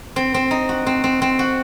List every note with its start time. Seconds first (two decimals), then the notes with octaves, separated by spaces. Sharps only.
0.16 C4
0.34 C4
0.51 D#4
0.69 F#4
0.86 C4
1.04 C4
1.22 C4
1.39 F#4